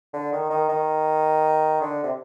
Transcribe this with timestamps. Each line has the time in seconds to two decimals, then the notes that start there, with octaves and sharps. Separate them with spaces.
0.13 D3
0.33 D#3
0.50 D#3
0.69 D#3
1.81 D3
2.04 C3